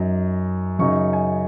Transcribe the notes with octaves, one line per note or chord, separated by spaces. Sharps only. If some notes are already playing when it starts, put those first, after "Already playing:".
Already playing: F#2 F#3 D#4
F#2 C#3 F#3 D#4 C#6
G#5